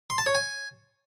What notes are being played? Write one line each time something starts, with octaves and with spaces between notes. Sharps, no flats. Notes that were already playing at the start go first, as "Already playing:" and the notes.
C6
A5
C#5
G#5